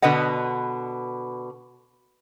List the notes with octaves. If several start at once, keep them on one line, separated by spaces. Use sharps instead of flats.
B2 D3 B4 D#5 F#5